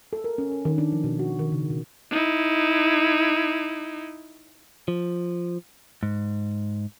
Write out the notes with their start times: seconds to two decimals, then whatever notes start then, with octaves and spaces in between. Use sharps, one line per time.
0.13 A4
0.24 A#4
0.38 C#4
0.51 A#4
0.65 D#3
0.78 D4
0.92 F3
1.04 B2
1.19 F#4
1.39 D#3
1.52 C#3
1.70 B2
2.11 D#4 E4
4.88 F3
6.03 G#2